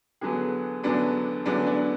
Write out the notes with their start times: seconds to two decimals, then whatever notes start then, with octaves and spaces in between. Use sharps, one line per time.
0.21 E2 D3 F#3 B3 G#4
0.83 E2 D3 F#3 B3 D4
1.46 E2 D3 F#3 B3 D4
1.66 D4